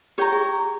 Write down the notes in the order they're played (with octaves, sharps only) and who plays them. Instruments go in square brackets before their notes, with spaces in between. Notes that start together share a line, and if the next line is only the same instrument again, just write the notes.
[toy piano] G4 [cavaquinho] C#5 G5 A#5
[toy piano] G#4